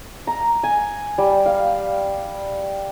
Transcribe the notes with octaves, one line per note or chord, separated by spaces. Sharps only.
A#5
G#5
G3
F5